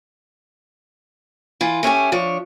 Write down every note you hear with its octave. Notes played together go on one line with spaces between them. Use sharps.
E3 F4
A3 C#4 G4 G#5
F3 D4 C#5